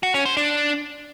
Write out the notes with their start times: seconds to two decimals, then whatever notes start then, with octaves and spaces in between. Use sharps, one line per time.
0.03 F#4
0.14 C#4
0.25 C5
0.37 D4